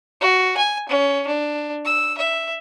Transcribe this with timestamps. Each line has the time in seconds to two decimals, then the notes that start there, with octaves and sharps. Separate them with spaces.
0.21 F#4
0.57 G#5
0.89 C#4
1.27 D4
1.85 E6
2.18 E5